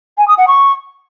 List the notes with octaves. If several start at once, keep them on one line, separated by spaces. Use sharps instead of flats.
G#5
D#6
F#5
C#6